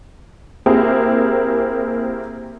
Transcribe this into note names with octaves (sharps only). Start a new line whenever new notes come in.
A#3 C4 E4 G4 G#4 A#4